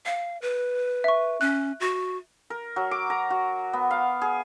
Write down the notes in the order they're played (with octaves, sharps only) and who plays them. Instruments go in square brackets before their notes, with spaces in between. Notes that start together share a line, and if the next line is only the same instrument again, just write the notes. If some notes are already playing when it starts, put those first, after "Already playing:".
[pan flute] F5
B4
[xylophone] E5 C#6
[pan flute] C#4 [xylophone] F#6
[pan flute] F#4
[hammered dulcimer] A#4
F#3
D6
A#5
F#4
B3
F5
G#4